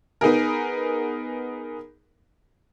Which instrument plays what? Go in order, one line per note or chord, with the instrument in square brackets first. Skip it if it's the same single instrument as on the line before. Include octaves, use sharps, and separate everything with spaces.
[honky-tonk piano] B3 D#4 G#4 A#4